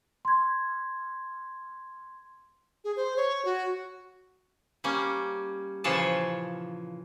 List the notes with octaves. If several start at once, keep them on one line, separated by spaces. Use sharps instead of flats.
C6 G#6
G#4
C5
C#5
F#4
G3 A#3 C#4
A#2 C#3 E3 F3 C#5 A5